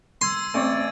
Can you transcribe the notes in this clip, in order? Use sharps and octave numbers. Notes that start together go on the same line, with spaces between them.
C6 E6 G#6 D#7
A1 C4 D5 C#6 A6 D#7